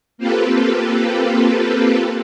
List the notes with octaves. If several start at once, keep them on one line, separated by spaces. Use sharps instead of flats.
A#3 C4 F4 G4 A4 B4